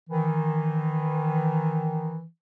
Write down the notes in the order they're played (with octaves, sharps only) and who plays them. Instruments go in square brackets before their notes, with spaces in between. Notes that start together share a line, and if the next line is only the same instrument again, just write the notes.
[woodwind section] D#3 E3